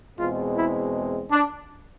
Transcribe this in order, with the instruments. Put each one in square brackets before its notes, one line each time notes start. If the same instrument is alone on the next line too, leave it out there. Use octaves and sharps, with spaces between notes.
[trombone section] E2 B2 G#3 C4 F4
E4
D4